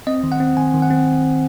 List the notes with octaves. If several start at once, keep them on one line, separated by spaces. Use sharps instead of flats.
C4 D#5
D#3
F#5
C4
D#3 G#5
D#3
F#5
C4